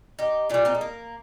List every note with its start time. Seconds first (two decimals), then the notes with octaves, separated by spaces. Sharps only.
0.19 D#4 G4
0.49 A#2 G3 D4 F4
0.65 C4 D#4
0.75 A3
0.81 A#3